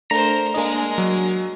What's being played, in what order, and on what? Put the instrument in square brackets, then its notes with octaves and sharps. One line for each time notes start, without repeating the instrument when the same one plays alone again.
[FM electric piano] A3 D4 [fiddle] A#4 C5 [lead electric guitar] A#5
[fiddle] G#3 A#4 [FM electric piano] A#3 D4 D#5
[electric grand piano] F#3